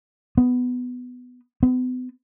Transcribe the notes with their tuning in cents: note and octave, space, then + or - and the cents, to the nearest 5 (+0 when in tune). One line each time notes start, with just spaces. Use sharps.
B3 +10
B3 +40